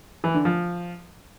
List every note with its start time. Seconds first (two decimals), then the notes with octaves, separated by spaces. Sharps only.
0.24 E3
0.34 D3
0.45 F3